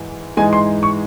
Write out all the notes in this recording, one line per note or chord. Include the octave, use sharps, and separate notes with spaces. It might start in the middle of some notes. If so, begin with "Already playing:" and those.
Already playing: G#2 E3
G#2 E3 G#3 D#4 G#5
C6
C#6